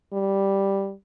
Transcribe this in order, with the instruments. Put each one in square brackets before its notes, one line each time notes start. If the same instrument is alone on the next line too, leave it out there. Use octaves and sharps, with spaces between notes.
[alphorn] G3